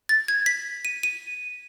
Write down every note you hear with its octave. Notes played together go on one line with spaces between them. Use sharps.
A6
G#6
B6
D#7
D#7